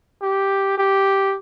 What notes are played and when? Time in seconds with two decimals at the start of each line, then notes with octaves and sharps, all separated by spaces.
0.22 G4
0.78 G4